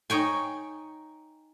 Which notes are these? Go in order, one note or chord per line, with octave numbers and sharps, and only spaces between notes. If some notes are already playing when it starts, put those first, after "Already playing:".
D#4 C#5 G5 G#5